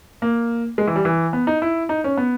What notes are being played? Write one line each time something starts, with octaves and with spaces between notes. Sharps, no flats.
A#3
G#3
E3
G3
E3
B3
D#4
E4
D#4
C#4
B3